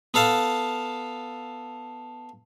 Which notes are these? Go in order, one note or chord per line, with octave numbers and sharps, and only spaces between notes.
B3 A4 F5 A5